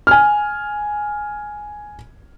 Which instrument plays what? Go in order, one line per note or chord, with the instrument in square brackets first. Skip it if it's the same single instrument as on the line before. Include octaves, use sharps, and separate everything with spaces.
[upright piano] G#5 F6